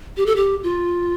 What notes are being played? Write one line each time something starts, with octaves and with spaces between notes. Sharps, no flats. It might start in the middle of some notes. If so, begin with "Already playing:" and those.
G4
A4
G4
F4